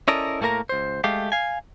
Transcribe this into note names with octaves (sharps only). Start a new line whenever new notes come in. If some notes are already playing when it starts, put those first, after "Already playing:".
C#4 E4 A4 A#4 D5 D#5
A2 A3 A#3 A#4 A#5
C#2 C5
G#3 A3 G4 F5
F5 G#5